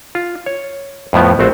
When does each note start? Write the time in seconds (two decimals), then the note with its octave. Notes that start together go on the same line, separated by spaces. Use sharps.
0.15 F4
0.46 C#5
1.13 F2 A2 F3 B3
1.39 A#1 A3 C4 F#4 C5